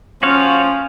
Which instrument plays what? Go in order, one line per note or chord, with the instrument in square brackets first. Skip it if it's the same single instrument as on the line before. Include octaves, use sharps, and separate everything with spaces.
[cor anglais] F3 [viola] C#4 [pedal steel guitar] F#4 C#5 F5